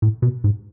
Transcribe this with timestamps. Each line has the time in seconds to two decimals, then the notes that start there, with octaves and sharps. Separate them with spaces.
0.02 A2
0.22 B2
0.44 G#2